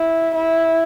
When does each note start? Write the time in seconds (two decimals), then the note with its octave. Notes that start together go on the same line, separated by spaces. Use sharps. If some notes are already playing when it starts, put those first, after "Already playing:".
Already playing: E4
0.35 E4